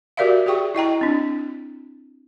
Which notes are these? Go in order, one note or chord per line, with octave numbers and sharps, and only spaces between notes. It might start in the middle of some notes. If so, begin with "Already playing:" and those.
F#4 G4 A#4 D5 E5 F5
G4 G#4 G5 C#6
E4 D#5 G5 A#5
C4 D4